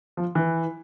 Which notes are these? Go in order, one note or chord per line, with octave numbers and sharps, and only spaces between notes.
F3
E3